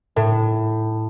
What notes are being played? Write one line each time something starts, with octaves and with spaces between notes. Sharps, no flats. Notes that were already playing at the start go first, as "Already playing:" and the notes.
A2